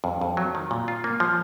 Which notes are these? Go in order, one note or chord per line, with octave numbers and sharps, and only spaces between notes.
F2
F2
F#3
D#3
A#2
F4
A#3
F3